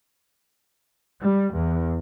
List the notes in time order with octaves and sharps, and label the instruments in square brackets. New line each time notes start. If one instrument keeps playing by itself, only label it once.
[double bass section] G3
E2